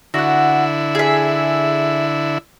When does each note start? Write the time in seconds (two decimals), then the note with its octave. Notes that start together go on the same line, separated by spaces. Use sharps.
0.14 D3 E4 F#4 F#5
0.95 G#4 E5